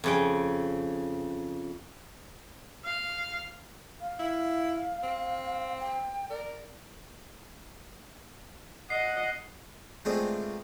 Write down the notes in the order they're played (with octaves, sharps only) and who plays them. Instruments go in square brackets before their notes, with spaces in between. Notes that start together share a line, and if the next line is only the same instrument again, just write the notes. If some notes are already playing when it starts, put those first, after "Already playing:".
[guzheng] F2 C#3 G5
[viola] F5
[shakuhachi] F5
[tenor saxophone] E4
C4
[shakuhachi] G5
[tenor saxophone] A#4 [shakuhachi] D5
[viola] D#5 F#5 [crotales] C7
[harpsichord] G#3 A3 B3 C4 D4 F4